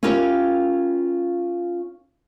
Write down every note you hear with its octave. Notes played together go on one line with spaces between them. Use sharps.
C#4 E4 F4 G4 A#4 C#5